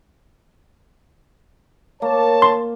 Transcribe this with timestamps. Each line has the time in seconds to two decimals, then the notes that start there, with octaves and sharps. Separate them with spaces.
2.02 A#3 C#5 A5
2.42 C6